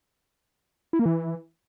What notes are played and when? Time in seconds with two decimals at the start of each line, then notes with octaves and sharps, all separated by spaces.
0.93 E4
0.99 A#3
1.06 E3